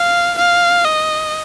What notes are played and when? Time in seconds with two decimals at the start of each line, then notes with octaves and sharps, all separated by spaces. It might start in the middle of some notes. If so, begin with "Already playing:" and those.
Already playing: F5
0.38 F5
0.85 D#5